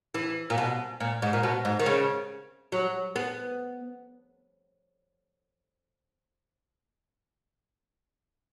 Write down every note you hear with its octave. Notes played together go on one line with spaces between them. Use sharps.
E3
A#2
B2
A#2
G#2
A#2
B2
G#2
D#3
C#3
F#3
B3